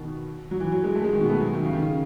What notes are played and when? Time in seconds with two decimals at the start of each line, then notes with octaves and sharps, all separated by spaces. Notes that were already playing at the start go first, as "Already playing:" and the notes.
Already playing: B2 D#3
0.51 F#3
0.60 E3
0.72 F#3
0.84 G#3
0.95 A3
1.04 G#3
1.12 D#3
1.20 B2
1.25 B3
1.30 A3
1.41 F#3
1.53 D#3
1.65 C#3
1.73 D#3
1.82 C#3